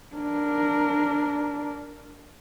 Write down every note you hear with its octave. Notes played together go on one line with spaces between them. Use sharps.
D4 A#4